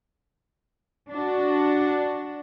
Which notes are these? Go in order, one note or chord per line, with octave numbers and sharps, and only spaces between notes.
D4 F#4